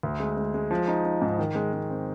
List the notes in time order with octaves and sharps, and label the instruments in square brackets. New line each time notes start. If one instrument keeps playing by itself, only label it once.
[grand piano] D2
G#3
G#3
G#3
F3
D#4
D#4
G#2
D#3
G#3
G#3
C4